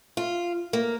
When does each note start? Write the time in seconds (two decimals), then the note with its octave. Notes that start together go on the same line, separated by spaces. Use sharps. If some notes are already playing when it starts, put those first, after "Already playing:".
0.17 F4
0.73 A#3